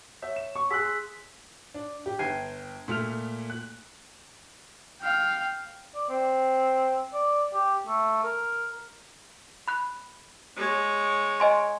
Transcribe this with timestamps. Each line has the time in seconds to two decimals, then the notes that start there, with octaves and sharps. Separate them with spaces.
0.22 C#5 E5
0.36 E7
0.55 C#6
0.70 G#4 C6 E6 F#6 B6
1.74 D4
2.06 G4
2.19 G1 G5 G#6 C7 D#7
2.88 A#2 A3 F6 F7
3.50 F#6
5.01 F5 G5
5.95 D5
6.10 C4
7.14 D5
7.54 G4
7.87 A3
8.23 A#4
9.68 B5 F#6
10.57 G#3 C#5
11.40 D#5 G#5 C6